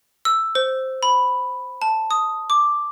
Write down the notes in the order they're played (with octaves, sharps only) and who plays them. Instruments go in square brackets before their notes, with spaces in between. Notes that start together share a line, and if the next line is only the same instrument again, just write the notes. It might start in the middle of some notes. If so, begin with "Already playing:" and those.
[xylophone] E6
C5
B5
A5
D#6
D6